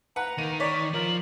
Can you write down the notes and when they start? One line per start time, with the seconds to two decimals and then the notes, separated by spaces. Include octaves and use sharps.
0.16 B4 F#5 A#5
0.38 D#3 A#3 D#7
0.60 C#5 D5 B6
0.94 F3 F4 A#4 F#7